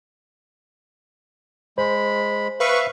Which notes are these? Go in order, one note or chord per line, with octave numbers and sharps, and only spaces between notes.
G#3 C5 B5
B4 E5 F5 C#6